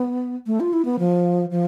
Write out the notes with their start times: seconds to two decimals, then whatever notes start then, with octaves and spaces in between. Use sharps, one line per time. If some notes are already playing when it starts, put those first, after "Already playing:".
Already playing: B3
0.46 A3
0.60 F4
0.73 E4
0.85 B3
0.99 F3
1.51 F3